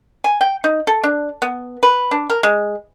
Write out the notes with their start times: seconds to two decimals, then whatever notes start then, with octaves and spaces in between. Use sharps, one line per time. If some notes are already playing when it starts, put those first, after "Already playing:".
0.24 G#5
0.41 G5
0.64 D#4
0.87 A4
1.04 D4
1.42 B3
1.83 B4
2.11 D4
2.30 A#4
2.43 G#3